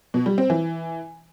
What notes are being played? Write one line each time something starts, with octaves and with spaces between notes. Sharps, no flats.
B2
G3
C4
E3